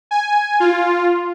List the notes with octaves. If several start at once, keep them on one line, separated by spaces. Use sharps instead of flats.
G#5
F4